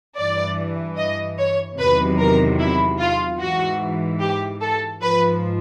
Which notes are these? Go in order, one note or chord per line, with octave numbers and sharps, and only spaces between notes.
G2 E3 D5
D#5
C#5
E2 C3 D#3 F#3 B4
A#4
E4
F4
G#2 E3 F#4
G4
A4
G#2 F3 B4